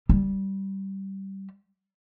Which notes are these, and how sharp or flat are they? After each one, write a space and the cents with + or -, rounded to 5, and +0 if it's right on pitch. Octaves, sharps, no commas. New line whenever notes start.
G3 -15